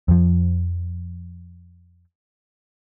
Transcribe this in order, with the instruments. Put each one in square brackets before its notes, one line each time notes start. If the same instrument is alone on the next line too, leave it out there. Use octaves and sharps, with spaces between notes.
[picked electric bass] F2 F3